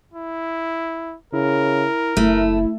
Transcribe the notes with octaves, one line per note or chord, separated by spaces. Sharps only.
E4
C#3 E4 A#4
F#1 A3 E4